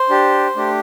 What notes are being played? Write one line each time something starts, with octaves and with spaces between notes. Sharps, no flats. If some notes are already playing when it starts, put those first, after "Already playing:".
Already playing: C5
D4 G4
A3 D4 G4